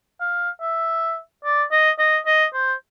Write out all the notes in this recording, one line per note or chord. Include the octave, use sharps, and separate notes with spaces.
F5
E5
D5
D#5
D#5
D#5
C5